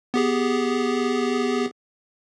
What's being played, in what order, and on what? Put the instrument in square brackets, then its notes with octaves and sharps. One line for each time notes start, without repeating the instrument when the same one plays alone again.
[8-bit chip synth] B3 G4 G#4